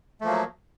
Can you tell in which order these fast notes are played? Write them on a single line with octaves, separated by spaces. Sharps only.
A3 F3 A#3 F#3